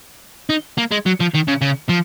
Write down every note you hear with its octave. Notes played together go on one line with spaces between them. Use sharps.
D#4
A#3
G#3
F#3
F3
D#3
C#3
C#3
F3